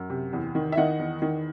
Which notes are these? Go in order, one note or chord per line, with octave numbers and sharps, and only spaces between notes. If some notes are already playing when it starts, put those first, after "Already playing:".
Already playing: F#2
C3
E2
D#3
E5
D#3 D#5 F#5
E2
D#3